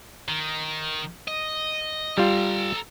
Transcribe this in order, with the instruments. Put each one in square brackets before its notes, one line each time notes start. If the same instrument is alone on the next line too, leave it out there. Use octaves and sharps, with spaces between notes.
[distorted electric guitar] D#3
D#5
[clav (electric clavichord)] G3 F4 [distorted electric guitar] A4 A#5